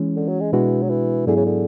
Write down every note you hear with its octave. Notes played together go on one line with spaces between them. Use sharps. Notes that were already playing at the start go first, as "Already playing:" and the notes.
Already playing: E3 G#3 C#4
D3
F#3
G#3
B2 E3 G#3 D4 F#4
F#3
E3
G#2 D3 F#3 B3 E4 G#4
C#3
D3